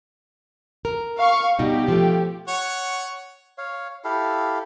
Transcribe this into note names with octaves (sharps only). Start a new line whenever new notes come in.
A#4
F5 C#6
B2 G3 D#4 G4
F3 A3
C#5 F#5
C#5 F5
E4 G4 A4 F5